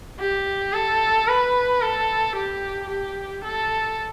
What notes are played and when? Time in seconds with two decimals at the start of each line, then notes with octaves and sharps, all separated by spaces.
0.19 G4
0.73 A4
1.27 B4
1.81 A4
2.35 G4
2.90 G4
3.44 A4